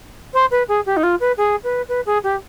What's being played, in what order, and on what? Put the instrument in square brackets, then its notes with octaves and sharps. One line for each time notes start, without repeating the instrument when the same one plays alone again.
[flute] C5
B4
G#4
G4
D#4
F4
B4
G#4
B4
B4
G#4
G4